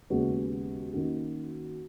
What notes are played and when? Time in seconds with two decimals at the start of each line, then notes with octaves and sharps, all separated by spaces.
0.10 D#2 C#3 G#3 B3 F#4
0.93 D#3 A#3 C#4 F#4